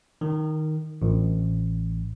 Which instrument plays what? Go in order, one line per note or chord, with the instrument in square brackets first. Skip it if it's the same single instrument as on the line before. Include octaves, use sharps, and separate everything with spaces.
[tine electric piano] D#3
A1